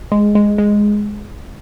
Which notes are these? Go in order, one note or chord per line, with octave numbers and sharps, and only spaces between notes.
G#3
G#3
G#3